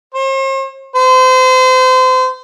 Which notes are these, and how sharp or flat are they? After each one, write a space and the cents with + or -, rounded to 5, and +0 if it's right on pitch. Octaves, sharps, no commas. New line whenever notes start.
C5 +45
C5 -30